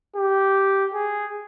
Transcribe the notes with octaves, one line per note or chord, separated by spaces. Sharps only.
G4
G#4